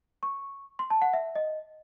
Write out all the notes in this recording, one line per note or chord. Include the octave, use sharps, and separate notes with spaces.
C#6
C6
A5
F#5
E5
D#5